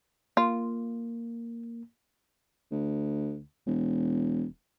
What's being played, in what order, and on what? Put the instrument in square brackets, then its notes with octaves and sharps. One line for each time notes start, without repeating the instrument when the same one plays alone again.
[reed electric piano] A#3 [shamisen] F4
[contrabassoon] D2
E1